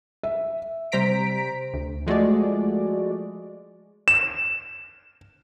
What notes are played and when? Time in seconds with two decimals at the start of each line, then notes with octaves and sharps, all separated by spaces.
0.23 E5
0.92 C3 G3 C5 A#5 B6 D7
1.74 D2
2.07 F3 G#3 A3 F#4 D5
4.08 E7